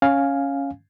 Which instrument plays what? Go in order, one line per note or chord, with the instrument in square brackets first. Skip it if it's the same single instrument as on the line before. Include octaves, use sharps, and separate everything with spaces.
[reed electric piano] C#4 F5 G#5